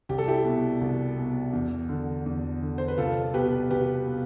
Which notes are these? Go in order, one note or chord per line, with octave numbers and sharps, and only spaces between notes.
C2 G4
A4
E4 G4
B2
C2
B2
E2
D3
E2
D3
C5
B4
C2 F4 A4
B2 G4 B4
C2 G4 B4
B2